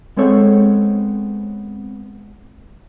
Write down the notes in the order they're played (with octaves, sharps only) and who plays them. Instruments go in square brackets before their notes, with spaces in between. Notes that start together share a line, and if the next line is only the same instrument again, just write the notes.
[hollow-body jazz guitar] G#3 B3 C4 A4 C#5